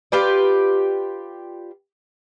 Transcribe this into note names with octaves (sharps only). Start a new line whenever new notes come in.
F4 G4 B4 D5